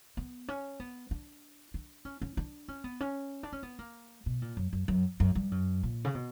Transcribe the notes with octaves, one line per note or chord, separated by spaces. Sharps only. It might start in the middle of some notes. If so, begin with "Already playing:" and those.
B3
C#4
B3
D4
D4
C#4
C#4
D4
C#4
B3
C#4
D4
C#4
B3
A#3
B2
A#2
F#2
F#2
F#2
F#2
G2
F#2
A#2
C#3
B2